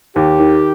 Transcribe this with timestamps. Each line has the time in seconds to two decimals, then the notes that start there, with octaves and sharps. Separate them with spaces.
0.16 D#2 G4
0.40 D#3